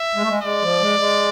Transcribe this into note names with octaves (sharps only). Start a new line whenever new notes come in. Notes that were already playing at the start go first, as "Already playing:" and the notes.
Already playing: E5
G#3
A3
G#3
G#3 D5
F3
G#3
G#3